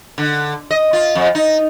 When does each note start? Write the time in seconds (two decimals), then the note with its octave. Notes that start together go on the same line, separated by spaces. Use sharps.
0.18 D3
0.71 D#5
0.93 F4
1.15 F2
1.35 D#4